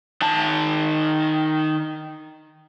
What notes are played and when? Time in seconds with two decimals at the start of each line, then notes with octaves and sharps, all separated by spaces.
0.22 D#3 A5